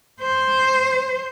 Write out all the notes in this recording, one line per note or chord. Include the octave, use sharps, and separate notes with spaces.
C5